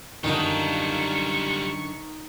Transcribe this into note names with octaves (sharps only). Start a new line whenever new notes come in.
F#2 D3 D#3 G3 F4 C#6